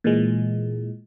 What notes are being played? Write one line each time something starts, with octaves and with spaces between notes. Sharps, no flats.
A#2 E3 G#3